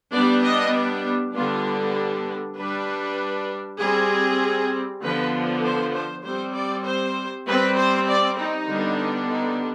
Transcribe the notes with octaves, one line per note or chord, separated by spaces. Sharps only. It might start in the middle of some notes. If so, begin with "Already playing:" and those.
G3 B3 D4 D5
D#5
D3 G3 B3 D4 F4
G3 D4 B4
G3 C4 G#4
D3 F3 B3 B4
C5
C5
G3 C4 C5
D5
C5
G3 C4 B4
C5
D5
D#4
D3 G3 B3 D4
D#4